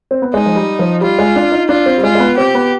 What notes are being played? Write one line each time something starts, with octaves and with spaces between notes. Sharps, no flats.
C4
B3
G#3 D#4
F3
G3
F3
G3 F4
G#3
D4
D#4
D4 F4
C4
G3
G#3 F4
G#3
B3
C4 G4
B3